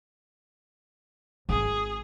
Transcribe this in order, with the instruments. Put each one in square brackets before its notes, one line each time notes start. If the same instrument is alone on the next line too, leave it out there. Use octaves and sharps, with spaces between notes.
[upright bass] G#1 [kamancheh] G#4